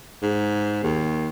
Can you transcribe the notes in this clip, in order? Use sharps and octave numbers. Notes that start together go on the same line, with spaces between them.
G#2
D#2